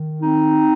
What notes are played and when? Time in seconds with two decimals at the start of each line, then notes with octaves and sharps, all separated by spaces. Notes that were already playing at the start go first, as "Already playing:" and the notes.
Already playing: D#3
0.20 C4 D#4